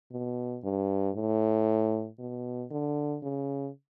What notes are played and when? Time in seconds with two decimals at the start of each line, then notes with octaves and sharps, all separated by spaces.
0.12 B2
0.64 G2
1.15 A2
2.19 B2
2.71 D3
3.23 C#3